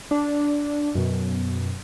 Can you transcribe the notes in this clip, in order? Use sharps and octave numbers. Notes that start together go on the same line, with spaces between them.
D4
F#2 B2